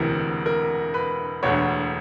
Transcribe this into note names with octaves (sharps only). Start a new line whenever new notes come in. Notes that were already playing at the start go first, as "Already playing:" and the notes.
Already playing: E1 D2 C3 E3 A#4
A#4
B4
E1 D2 D3 C#5